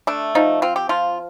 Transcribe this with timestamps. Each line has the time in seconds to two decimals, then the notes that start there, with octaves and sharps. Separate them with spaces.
0.07 A3 D4
0.35 F3 D#4
0.62 C4 F4
0.76 G4
0.89 F3 F4